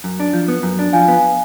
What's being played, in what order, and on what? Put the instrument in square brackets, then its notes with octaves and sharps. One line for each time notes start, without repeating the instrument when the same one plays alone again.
[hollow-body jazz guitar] F#2
D4
F3
B3
F#2
D4
[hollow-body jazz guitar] F3 [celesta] F5 G#5
[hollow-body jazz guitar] B3